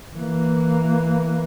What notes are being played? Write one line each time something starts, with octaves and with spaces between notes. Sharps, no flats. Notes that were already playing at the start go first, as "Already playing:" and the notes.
E3 A#3